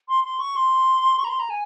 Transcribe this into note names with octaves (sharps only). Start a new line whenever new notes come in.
C6
C6
C#6
C6
C#6
A#5
C6
A#5
G#5